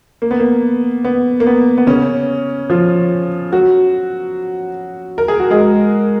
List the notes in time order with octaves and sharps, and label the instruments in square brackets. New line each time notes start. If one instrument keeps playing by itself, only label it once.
[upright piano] A#3
B3
A#3
B3
A#3
B3
B3
C#3 C#4
F3 F4
F#3 F#4
A#4
G#4
F#4
G#3 G#4